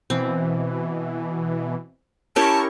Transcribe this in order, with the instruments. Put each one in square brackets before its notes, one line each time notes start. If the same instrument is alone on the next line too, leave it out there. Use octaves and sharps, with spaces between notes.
[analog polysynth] B2 E3 [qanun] C4
[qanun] C#4 E4 G4 [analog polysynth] A#4 C#6 [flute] A5